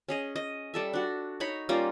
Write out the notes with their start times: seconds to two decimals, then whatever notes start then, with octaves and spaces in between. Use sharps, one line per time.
0.09 C#4 G#4 D#5
0.36 D#5
0.74 G3 A4 E5
0.93 D4 F#4
1.40 D#4 C#5 B5
1.69 G3 A#3 C#4 F4